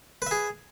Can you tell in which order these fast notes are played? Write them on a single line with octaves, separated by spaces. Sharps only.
B4 E5 G#4